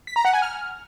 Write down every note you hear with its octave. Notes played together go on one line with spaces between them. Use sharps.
B6
A#5
F#5
G#5
F6